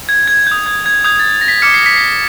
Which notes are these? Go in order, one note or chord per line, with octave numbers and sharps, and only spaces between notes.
G#6
G#6
D#6 G6
G#6
G#6
D#6 G6 G#6
A6
A#6
B6
D6 F6 C#7
C7
B6
C7